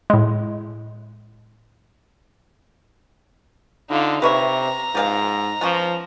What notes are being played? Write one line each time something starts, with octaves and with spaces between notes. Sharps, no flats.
A2 G#3
D3 D#4 F4
C3 B4 C#5 E5 A#5
G#2 F3 G4 F5
F3 B3 C#4 F4